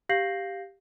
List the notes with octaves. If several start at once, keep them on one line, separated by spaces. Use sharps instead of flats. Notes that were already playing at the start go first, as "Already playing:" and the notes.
G4 F5 G6 A#6 C7 F#7